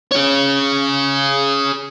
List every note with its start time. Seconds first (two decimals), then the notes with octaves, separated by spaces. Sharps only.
0.12 G#4 C#5